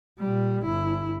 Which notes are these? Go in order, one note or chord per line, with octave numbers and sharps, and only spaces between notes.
A#2 G3
G1 E4